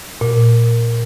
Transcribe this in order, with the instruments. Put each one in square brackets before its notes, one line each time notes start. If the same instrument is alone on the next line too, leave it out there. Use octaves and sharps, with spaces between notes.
[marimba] A#2